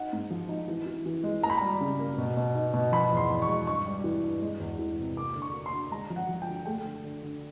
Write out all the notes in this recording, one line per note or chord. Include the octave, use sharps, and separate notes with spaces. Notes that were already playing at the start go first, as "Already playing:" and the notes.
Already playing: D#4 F#5
G#2
F3
D#4
E3
E3
E3
G#3
A#3 A#5
B5
G3 A#5
C#3
A#3
B2
B2
D#4
B2
F3 B5
E2
C6
E2
C#6
G#3
G2 C#6
G3
E3
G2
G#3
E2
E3
C3
A#3 D6
D3
C#6
A#3
C6
D3
G#3 A#5
F3
F#5
F3
G5
D3
A3 G5
D3
D3
D3